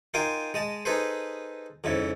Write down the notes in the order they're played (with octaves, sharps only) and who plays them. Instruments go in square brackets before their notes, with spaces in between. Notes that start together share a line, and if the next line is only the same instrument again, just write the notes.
[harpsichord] D#4 F4 A#4 G5 G#5 C6
G#3 D#5 A5
D#4 G#4 A4 B4 C5
F2 G#2 C#3 E4